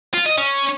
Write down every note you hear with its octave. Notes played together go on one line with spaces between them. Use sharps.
F4
D#5
C#4